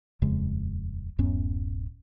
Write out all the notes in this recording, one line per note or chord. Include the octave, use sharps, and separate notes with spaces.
D#1 F2 C#3 G#3
D1 F#2 B3 C#4